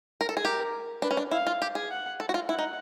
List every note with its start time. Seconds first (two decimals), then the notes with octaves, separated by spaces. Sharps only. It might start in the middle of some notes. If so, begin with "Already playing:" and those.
0.21 A#4
0.29 A4
0.37 G#4
0.44 G4 A#4
1.02 D4 B4
1.11 C#4
1.17 D4
1.31 E4 F5
1.47 F4
1.62 G4
1.75 G#4
1.91 F#5
2.20 A4
2.29 F#4
2.34 F4
2.49 E4 F#5
2.59 D#4